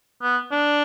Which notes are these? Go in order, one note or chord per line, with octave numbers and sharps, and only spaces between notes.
B3
D4